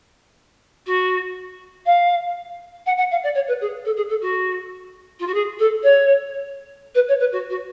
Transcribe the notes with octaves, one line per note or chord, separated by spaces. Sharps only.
F#4
F5
F#5
F#5
F5
D5
C#5
B4
G#4
A4
G#4
A4
F#4
F4
F#4
G#4
A4
C#5
B4
C#5
B4
F#4
F#4